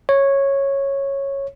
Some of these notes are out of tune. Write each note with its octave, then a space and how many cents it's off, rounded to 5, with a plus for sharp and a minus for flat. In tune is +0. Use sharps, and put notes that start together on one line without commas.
C#5 -10